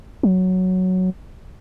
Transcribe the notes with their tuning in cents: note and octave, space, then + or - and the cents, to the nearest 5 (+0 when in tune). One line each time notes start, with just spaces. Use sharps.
F#3 +0